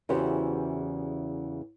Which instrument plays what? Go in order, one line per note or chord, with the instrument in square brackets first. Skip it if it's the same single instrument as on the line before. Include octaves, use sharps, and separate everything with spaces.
[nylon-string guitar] E2 C#3 E3 F#4 G4 C5